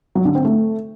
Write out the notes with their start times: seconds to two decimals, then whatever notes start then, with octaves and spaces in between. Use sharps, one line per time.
0.15 F#3
0.25 D3
0.35 C4
0.45 A3